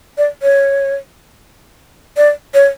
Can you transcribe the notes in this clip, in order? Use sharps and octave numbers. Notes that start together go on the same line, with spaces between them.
D5
C#5
D5
C#5